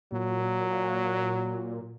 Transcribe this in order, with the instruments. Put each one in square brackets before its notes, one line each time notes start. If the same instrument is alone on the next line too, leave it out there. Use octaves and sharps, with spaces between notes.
[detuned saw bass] A#2 [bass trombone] F#3